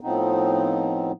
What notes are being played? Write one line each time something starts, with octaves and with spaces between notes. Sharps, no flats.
A2 F3 B3 C4 D#4